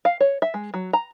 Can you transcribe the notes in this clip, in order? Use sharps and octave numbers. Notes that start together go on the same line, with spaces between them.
F5
C#5
E5
G#3
F#3
A#5